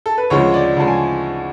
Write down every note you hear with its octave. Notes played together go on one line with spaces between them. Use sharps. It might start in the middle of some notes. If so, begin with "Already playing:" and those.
A4
B4
D2 C#3 F3 G#3 C#5
D5
D2 C#3 F3 G#3 A5
G#5